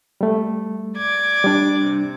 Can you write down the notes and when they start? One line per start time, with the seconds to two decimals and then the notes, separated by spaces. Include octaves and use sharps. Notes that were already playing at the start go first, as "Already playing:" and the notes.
0.21 G3 A3
0.97 D5 D6 G#6
1.44 G3 D4
1.82 C3